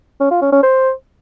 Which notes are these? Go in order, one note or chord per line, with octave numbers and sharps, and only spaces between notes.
C#4
F4
C#4
C#4
C5